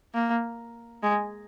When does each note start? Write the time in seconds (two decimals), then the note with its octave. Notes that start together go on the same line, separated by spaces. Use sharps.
0.14 A#3
1.03 G#3